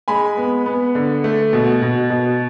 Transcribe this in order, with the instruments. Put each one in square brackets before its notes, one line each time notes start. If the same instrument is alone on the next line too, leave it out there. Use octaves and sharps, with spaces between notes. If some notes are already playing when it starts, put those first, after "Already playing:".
[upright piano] G#3 G#5 B5
B3
B3
D3
A3
B2
B2
B2